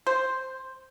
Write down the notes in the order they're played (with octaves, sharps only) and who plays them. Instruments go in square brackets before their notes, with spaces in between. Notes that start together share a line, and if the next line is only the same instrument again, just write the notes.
[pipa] C5